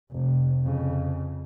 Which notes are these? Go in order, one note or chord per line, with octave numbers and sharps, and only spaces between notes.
F1 C3
F2 C#3